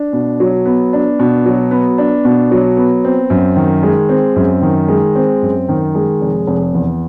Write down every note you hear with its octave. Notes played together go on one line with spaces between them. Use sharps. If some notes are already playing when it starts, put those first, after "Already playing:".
Already playing: D4
B2
F#3
B3
D4
B2
F#3
B3
D4
B2
F#3
B3
C4
F#2
D#3
G#3
C4
F#2
D#3
G#3
C4
F#2
D#3
G#3
F1
F1
E2